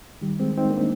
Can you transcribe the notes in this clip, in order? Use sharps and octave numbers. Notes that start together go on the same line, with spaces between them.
D#3 G3
G#3 C4
C4 D#4
A#3 D4
C4